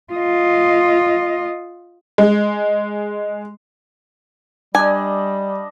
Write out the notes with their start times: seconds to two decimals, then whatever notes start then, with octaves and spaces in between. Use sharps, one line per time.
0.13 F4 D#5
2.18 G#3
4.75 G3 D4 D#5 G#5